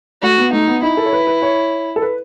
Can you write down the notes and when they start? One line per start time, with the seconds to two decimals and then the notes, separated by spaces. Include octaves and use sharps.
0.22 A3 F#4
0.38 B3
0.52 A3 D#4
0.67 B3
0.82 D#4 E4
0.97 A4
1.05 C#5
1.13 B4
1.27 B4
1.42 C#5
1.96 A4
2.02 B4